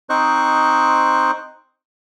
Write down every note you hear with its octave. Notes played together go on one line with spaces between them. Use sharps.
C4 D#4 C5 D#5 C#6 F#6